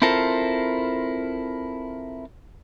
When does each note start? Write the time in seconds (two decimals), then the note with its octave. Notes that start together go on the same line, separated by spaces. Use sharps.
0.02 C4 E4 F4 A4 A#4 C5